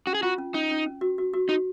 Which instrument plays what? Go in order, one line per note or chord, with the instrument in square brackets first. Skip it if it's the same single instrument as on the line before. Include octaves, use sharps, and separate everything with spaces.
[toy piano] C#4 [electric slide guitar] F#4
[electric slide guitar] G#4
[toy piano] F4 [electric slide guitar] F#4
[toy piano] C#4
[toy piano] C#4 [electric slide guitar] D#4
[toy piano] C#4
C#4
F#4
F#4
F#4
[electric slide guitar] D#4 [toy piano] F#4